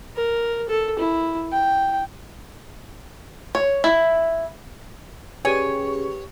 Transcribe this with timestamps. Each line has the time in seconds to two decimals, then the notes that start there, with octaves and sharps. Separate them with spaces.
0.16 A#4
0.69 A4
0.99 E4
1.52 G5
3.55 C#5
3.84 E4
5.45 C#3 G4 B4 C#5 G#5